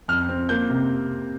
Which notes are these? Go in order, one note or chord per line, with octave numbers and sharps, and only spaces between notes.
F2 F6
C4
A#3 G6
C3